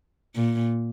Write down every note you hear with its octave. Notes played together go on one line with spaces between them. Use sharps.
A#2